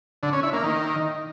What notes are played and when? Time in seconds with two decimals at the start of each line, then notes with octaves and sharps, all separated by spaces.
0.23 D3
0.33 C#4
0.43 E4
0.53 A#3
0.63 D#3